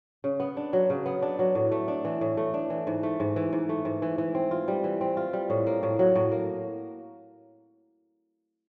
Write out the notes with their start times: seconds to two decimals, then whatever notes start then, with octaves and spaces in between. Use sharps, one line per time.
0.24 C#3
0.40 B3
0.57 D4
0.73 F#3
0.90 C#3
1.06 B3
1.22 D4
1.39 F#3
1.55 A2
1.72 A3
1.88 D4
2.05 E3
2.21 A2
2.37 A3
2.54 D4
2.70 E3
2.87 G#2
3.03 A3
3.20 G#2
3.36 E3
3.53 G#2
3.69 A3
3.85 G#2
4.02 E3
4.18 E3
4.35 C4
4.51 F4
4.68 G3
4.84 E3
5.01 C4
5.17 F4
5.33 G3
5.50 A2
5.67 A#3
5.83 A2
5.99 F#3
6.15 A2
6.32 A#3